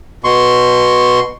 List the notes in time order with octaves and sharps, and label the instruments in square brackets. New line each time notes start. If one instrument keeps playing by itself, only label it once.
[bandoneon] B2 C6 C#6